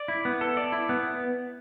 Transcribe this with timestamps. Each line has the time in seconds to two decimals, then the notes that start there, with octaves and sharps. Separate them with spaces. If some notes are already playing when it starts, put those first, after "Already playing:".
Already playing: D5
0.08 E4
0.25 B3
0.41 A4
0.57 D5
0.72 E4
0.89 B3